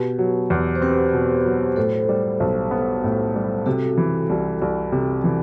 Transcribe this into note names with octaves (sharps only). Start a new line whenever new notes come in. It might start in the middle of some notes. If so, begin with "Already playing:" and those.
Already playing: B2 G4 B4
F#3
E2
C5
C4 G4 B4
B2
F#3
A2 A4 C5
G3
B1
B3
A2
G3
C3 F#4 A4
E3
C2
C2
C3
E3